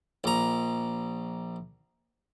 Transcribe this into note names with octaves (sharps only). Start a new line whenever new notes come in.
A#1 A#5